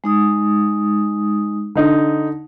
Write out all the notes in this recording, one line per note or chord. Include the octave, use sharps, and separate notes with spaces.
G#3 D#4 D#6
D3 D#4